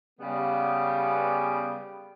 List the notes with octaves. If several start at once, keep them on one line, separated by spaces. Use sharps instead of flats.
C#3 G3 B3